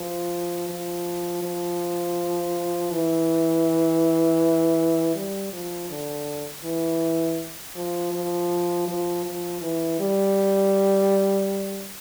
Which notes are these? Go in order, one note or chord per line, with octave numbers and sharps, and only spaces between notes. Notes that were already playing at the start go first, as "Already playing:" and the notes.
Already playing: F3
F3
F3
E3
G3
F3
D3
E3
F3
F3
F3
F3
E3
G3